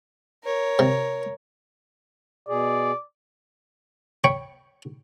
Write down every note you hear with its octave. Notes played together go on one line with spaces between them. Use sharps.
A#4 C#5
C3
B2 G#4 D5
C#5 G5 B5 C#6